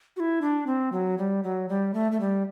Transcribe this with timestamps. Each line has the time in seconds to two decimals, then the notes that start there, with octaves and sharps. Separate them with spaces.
0.16 F#4
0.20 E4
0.42 D4
0.67 C4
0.92 F#3
1.18 G3
1.43 F#3
1.69 G3
1.94 A3
2.12 A3
2.20 G3